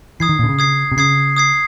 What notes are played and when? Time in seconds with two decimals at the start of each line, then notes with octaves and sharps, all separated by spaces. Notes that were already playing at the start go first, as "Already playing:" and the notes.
0.20 E3 D#6 G#6 C7
0.29 D#3
0.39 A#2
0.44 D3
0.49 C#3
0.59 D#6 G#6 C7
0.92 C3
0.97 C#3 D#6 G#6 C7
1.37 D#6 G#6 C7